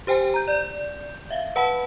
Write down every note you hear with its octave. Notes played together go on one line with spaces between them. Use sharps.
G4 C5 G5 G#5
A#5 G6
D5 G6
E5 F5
B4 F#5 A5 B5